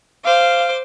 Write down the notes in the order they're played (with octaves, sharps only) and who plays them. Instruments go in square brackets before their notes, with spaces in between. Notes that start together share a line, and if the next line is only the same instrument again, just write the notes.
[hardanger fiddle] C5 D6 [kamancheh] F5